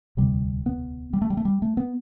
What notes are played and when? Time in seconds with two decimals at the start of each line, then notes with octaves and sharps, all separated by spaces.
0.17 E1 D2 C3 G3
0.66 B3
1.13 G3
1.22 A3
1.30 G3
1.37 A3
1.45 G3
1.62 A3
1.77 B3